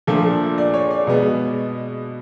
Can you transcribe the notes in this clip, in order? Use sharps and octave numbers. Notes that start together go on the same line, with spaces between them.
A#2 F3 A3 D4 A4
D5
C#5
D5
B2 G#3 B3